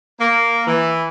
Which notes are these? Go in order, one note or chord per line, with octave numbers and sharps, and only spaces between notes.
A#3
E3